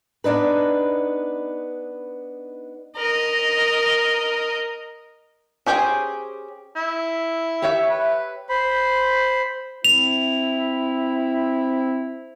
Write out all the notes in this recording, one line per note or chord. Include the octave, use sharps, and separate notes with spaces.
B3 D4 D#4 B4
A#4 D#5
C#4 G4 G#4 C5 G5
E4
G4 C#5 E5
B4
C5 B5
C4 E4 F7